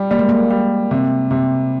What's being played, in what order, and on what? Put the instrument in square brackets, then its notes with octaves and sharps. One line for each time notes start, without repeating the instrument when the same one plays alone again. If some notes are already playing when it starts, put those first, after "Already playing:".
Already playing: [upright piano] G3
[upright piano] G3 [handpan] A#3
[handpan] G#3
A#3
[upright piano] G3
C3
C3